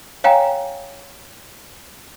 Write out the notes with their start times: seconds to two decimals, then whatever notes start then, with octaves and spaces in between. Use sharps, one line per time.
0.24 C#5 F5 G5 G#5 A#5